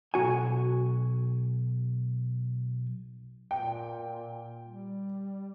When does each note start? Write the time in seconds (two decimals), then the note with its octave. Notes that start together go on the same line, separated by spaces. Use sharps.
0.14 B1 B2 F#4 G#5
3.51 A#2 G5
4.66 G3